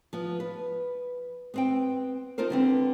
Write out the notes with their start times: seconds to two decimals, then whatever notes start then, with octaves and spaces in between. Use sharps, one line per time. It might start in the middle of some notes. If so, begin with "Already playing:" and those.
0.13 F3 B3
0.40 B4
1.54 B3 C4 G5
2.38 D#4 F4 A4 A#4 C5
2.50 D3 B3 C4